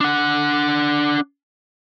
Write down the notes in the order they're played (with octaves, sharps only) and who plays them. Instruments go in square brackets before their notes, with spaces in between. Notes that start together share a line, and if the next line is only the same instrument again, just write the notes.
[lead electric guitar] D4 F#5